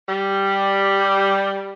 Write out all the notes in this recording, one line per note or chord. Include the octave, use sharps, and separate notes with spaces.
G3